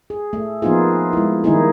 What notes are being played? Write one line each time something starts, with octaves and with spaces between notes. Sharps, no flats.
G#4
A3
F3 A#3 B3 D#4 F4 G#4
G#3 E4
D#3 G3 A#3 D#4 E4 G#4